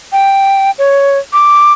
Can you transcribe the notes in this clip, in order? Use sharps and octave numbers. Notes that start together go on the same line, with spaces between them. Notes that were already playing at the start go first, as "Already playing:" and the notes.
G5
C#5
D6